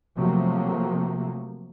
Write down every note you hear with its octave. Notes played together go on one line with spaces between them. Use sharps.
C3 F3 F#3 A3 A#3